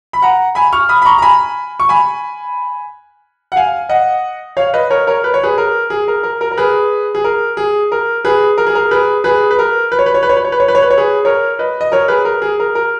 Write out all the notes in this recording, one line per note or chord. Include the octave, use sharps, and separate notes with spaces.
B5
F#5 A#5
G#5 B5
C#6 F6
B5 D#6
B5
A#5 C#6
A#5
G#5 B5
C#6
G#5 B5
F#5
F5 G#5
D#5 F#5
C#5 F5
B4 D#5
A#4 C#5
A#4 C#5
B4
C#5
G#4 B4
A#4
G#4
A#4
A#4
A#4
A#4
G#4 B4
G#4
A#4
G#4
A#4
G#4 B4
A#4
G#4
A#4
G#4 B4
G#4 B4
B4
A#4
B4
C#5
B4
C#5
B4
C#5
B4
C#5
B4
C#5
B4
C#5
B4
C#5
G#4 B4
A#4 C#5
B4 D#5
D#5
A#4 C#5
G#4 B4
A#4
G#4
A#4
A#4